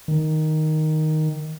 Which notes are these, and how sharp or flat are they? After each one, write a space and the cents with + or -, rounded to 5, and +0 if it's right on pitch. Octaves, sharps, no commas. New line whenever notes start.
D#3 +0